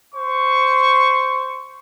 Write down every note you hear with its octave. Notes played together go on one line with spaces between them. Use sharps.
C5 C#6